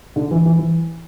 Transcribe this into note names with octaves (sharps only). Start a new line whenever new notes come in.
D3
E3
E3
E3